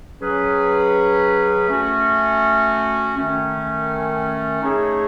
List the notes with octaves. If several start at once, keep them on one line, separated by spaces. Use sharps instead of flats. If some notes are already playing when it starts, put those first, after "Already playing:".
F#3 C#4 G#4 B4
A3 C#4 F#4
D#3 A3 C#4
A3 D#4 G#4 C#5